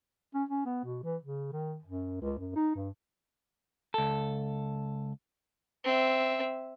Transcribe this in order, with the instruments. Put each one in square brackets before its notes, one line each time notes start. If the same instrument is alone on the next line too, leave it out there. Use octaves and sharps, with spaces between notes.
[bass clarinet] C#4
C#4
B3
B2
E3
C#3
D#3
F#2
C#2
F#2
D#4
G2
[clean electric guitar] C#2 A4
[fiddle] C4 E5